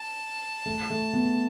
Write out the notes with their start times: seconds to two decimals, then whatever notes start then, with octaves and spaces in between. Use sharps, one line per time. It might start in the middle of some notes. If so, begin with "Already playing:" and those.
Already playing: A5
0.66 A3
0.90 A3
1.13 B3